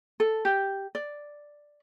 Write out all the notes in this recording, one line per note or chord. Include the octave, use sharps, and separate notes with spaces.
A4
G4
D5